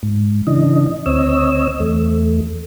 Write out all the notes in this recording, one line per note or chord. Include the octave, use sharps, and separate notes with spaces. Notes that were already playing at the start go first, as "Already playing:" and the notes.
G#2
C#3 E3 D4 D#5
D2 C4 C#5 D#5 E6
E2 A3